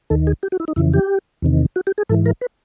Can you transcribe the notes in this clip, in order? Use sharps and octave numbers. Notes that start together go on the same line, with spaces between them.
D#2 D#3 A4
G#4
G4
F#4
E4
D#4
F2 C#3 E3 E4
G4
E2 C3 D#3
F#4
G4
G#4
G#2 E3 A4
A#4
B4